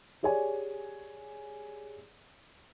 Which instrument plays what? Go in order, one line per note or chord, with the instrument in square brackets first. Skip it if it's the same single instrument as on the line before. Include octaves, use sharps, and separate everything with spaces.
[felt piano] G4 G#4 C#5 D5 G#5